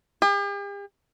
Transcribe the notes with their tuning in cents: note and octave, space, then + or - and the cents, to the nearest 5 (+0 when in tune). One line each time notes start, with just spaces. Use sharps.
G4 +45